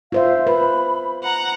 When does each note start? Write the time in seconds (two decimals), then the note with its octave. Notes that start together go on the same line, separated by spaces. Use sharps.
0.12 F4 C5 E5 F5
0.47 B4 B5
1.23 F#5 A#5